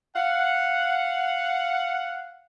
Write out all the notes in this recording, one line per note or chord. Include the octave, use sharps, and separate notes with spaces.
F5 F#5